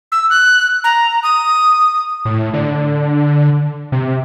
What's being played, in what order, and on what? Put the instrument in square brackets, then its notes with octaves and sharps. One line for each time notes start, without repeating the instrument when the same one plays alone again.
[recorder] E6
F#6
A#5
D#6
[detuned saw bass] A2
D3
C3